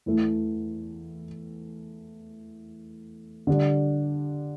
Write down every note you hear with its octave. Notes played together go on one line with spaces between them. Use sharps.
E2 E3 A3
D3 G3 D4